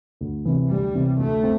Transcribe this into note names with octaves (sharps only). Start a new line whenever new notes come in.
D2
C3 E3
D2 G3
C3 E3
D2 A3
C4